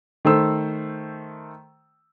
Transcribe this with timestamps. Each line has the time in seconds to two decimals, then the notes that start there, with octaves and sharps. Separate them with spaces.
0.25 D#3 A3 C5 E6